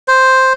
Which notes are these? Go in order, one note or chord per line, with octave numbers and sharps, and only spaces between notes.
C5